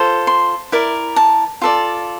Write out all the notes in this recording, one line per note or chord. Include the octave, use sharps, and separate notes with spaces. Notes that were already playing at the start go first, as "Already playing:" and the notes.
Already playing: F4 A4 C5
C6
E4 A#4 D5
A5
F4 A4 D5